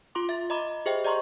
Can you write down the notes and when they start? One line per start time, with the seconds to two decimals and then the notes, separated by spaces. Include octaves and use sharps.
0.15 F4 C6 D6
0.29 E5 A6
0.50 D#5 A#5 B5 D6
0.86 G4 G#4 C5 D#5 E5 G5
1.05 D5 D#5 A#5 C6 C#6